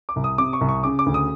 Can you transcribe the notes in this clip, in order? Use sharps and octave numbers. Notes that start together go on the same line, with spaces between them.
D6
C2
D#6
C3 D6
C#6
C2
C#6
C#3 D6
D6
D2
D#6